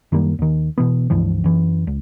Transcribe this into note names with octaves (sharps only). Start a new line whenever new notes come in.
F#2 D#3 G3 A#3
D#2 D#3
B2 E3 B3
C#2 G2 E3 F3
F#2 E3
C#2